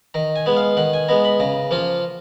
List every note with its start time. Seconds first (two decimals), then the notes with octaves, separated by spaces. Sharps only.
0.14 D#3 A#5
0.36 G#5
0.46 G#3 B3
0.57 F5
0.77 D#3 F#5
0.93 G#5
1.09 G#3 B3 A#5
1.25 B5
1.40 C#3 A#5
1.71 F3 A#3 F4